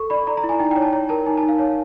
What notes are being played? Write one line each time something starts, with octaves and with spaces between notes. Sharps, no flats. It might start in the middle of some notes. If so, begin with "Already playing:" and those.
Already playing: A4 C#6
D5 B5
D5 A#5
A#5
E4
G#5
D#4 G5
G5
C#5
A5
C#5 A#5
A#4 A5
D#4 G#5
A5
D#4
F5
C#5